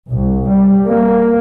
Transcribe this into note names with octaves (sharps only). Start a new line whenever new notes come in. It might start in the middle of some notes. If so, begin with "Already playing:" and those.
C2
G3
A#3